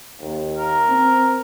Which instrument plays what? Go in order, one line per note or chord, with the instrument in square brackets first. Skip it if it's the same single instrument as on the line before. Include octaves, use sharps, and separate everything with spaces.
[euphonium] D#2
[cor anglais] A#4
[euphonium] C4